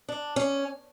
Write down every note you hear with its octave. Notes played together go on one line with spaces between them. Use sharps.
D4
C#4